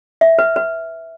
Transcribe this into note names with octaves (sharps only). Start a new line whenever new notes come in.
E5
B4
B4